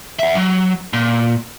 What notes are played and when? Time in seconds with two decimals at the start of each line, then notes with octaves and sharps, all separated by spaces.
0.19 E5 F#5
0.35 F#3
0.93 A#2